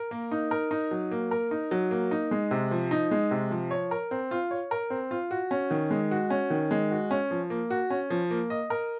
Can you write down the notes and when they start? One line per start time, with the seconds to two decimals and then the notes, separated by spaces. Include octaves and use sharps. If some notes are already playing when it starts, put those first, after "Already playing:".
Already playing: A#4
0.11 A#3
0.31 D#4
0.51 A#4
0.71 D#4
0.91 F#3
1.11 A#3
1.31 A#4
1.51 D#4
1.71 F#3
1.91 A#3
2.11 D#4
2.31 G#3
2.51 C3
2.71 F3
2.91 D#4
3.11 G#3
3.31 C3
3.51 F3
3.71 C#5
3.91 A#4
4.11 C4
4.31 F4
4.51 C#5
4.71 A#4
4.90 C4
5.11 F4
5.31 F#4
5.51 C#4
5.71 D#3
5.90 G#3
6.11 F#4
6.30 C#4
6.50 D#3
6.71 G#3
6.91 F#4
7.11 C#4
7.31 F3
7.50 A#3
7.70 F#4
7.90 C#4
8.10 F3
8.31 A#3
8.50 D#5
8.70 A#4